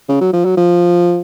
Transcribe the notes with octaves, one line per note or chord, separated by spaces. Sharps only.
C#3
F#3
F3
F#3
F3